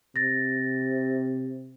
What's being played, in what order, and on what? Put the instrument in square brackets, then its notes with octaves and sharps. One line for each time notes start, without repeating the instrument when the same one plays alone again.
[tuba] C3 [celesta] A6 A#6